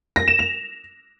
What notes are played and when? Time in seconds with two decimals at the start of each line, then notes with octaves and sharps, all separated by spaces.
0.16 A#6
0.28 E7
0.39 F7